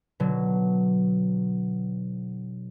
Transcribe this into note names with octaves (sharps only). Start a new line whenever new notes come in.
B2 D3 F#3